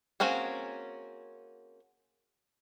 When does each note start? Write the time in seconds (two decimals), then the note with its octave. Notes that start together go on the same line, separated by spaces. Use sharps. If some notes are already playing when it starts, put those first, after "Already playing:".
0.20 A#3 C4 C#4 F#4 G#4